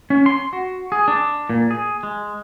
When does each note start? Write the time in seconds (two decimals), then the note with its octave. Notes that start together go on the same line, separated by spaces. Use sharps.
0.10 C#4
0.26 C6
0.53 F#4
0.92 G#4
1.08 D4
1.50 A#2
1.71 G#4
2.03 G#3